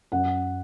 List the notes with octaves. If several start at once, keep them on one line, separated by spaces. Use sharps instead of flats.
F#2 F#5